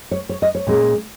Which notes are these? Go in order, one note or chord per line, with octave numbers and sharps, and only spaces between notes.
C#5
C#5
D#5
C#5
A#2 G#3 C#4